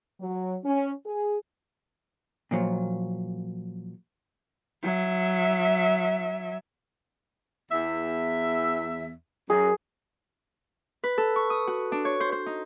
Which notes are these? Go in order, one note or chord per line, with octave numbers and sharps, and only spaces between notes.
F#3
C#4
G#4
A#2 F3 F#3
F#3 E5
E2 E5
F#2 G#4
B4
A4
C#6
D#6
F#4
D4
C#5
C5
C5
D#4